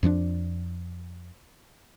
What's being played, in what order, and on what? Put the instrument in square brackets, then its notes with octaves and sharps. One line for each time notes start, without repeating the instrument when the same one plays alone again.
[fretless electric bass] F2 F3 A3 D4